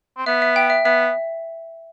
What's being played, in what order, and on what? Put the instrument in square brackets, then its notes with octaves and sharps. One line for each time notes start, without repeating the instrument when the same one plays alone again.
[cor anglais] C4
[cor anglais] B3 [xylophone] E5
[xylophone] E5
G5
E5
[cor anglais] B3 [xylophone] E5